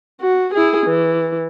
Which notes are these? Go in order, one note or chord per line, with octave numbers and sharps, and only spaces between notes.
F#4
E4 G#4
E3